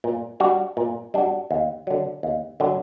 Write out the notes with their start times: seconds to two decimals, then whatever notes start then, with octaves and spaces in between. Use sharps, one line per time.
0.04 A#2
0.40 G3 D4 F#4
0.77 A#2
1.14 G3 D4 F#4
1.51 D#2
1.87 D3 F#3
2.23 D#2
2.60 D3 F#3